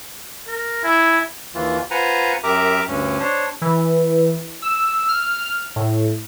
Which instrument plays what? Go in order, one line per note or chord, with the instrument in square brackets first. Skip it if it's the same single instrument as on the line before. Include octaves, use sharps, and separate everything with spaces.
[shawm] A#4
[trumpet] E4 [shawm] G#5
[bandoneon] D#2 E3 F4
F4 B4 C5 F#5 G#5 A#5
F#2 G4 A#4 E5 A#5 D6
D2 G2 C#4
D4 C5 C#5
[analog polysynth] E3
E6
F6
A2